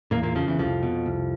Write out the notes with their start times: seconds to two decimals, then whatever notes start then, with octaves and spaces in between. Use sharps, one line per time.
0.11 E2 A#2 A#3
0.23 A#2 A#3
0.35 F2 C#3 F3
0.47 E2 E3
0.58 C2 F2 F3
0.83 B2
1.06 C2